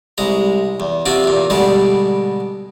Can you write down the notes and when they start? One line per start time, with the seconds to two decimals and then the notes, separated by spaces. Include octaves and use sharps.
0.18 C2 G#3 A#5
0.80 E2
1.06 C3 C4 F4 F#4
1.24 E2 A#2
1.50 B2 D3 G3 G#3